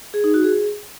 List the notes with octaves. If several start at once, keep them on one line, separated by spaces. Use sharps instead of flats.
G#4
D#4
F#4
G#4